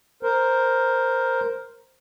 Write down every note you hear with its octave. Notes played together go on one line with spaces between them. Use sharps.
A#4 C5